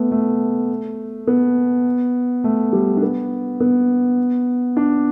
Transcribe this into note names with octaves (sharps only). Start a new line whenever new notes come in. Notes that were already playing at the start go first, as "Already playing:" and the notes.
Already playing: A3 B3
A3
B3
A3
G3
D4
B3
B3
D4